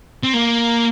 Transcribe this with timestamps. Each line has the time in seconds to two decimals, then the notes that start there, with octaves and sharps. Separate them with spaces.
0.24 C4
0.34 A#3